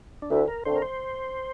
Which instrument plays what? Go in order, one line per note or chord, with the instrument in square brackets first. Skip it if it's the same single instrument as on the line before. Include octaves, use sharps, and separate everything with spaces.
[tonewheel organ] D4
[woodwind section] D2 [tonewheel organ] E4
[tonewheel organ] A#4
[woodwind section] D3 A3 C4 [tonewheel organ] C5
[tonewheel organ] A#4
C5